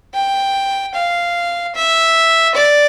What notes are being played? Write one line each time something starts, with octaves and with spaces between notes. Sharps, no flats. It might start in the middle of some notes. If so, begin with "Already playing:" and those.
G5
F5
E5
D5